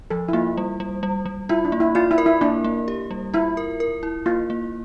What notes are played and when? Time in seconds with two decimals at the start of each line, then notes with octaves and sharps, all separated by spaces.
0.10 F3 A4
0.29 E4
0.33 A#3 F4
0.57 G3
0.80 G3
1.03 G3
1.26 G3
1.49 E4 F4
1.65 D4
1.72 A#3
1.80 E4
1.95 F4 D5
2.11 E4
2.18 A#4
2.26 E4
2.41 A#3 D4
2.64 A#3
2.88 G4
3.11 G3
3.34 E4 F4
3.57 A#4
3.80 A#4
4.03 E4
4.26 A#3 F4
4.50 A#3